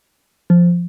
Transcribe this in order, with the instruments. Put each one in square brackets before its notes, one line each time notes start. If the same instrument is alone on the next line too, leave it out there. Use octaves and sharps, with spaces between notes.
[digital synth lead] F3